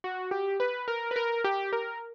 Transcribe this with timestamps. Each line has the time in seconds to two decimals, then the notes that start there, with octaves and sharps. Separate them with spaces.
0.04 F#4
0.31 G4
0.60 B4
0.88 A#4
1.11 B4
1.16 A#4
1.44 G4
1.73 A#4